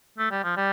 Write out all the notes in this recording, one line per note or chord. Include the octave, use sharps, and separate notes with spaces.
A3
G3
F3
G3